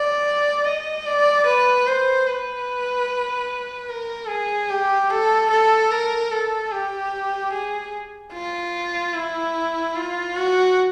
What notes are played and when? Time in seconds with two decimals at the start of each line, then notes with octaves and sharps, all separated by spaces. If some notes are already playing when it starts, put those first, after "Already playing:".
Already playing: D5
0.65 D#5
1.06 D5
1.47 B4
1.86 C5
2.27 B4
3.89 A#4
4.29 G#4
4.70 G4
5.10 A4
5.50 A4
5.90 A#4
6.31 A4
6.72 G4
7.53 G#4
8.34 F4
9.14 E4
9.95 F4
10.35 F#4